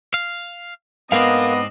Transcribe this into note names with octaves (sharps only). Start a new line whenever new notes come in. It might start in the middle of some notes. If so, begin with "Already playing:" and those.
F5
G#2 B3 C4 D4 A#4 D#5 F5